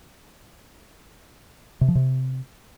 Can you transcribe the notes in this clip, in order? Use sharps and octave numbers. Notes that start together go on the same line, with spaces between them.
C3
F3
C3